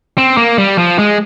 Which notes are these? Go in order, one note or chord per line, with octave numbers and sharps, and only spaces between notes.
C4
A#3
G3
F3
G#3